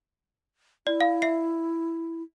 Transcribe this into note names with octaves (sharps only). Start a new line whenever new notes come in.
E4 D5
F5
E5 C7